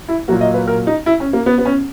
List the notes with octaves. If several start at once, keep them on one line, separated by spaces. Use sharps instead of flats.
E4
A#2 F#3 A#3 F#4
D#5
B4
A#4
D#4
E4
C#4
A#3
B3
B3
C#4